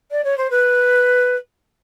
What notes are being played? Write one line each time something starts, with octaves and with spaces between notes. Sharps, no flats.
D5
C#5
C5
B4